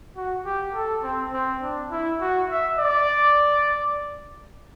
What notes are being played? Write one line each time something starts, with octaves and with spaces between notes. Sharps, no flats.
F#4
G4
A4
C4
C4
D4
E4
F#4
E5
D5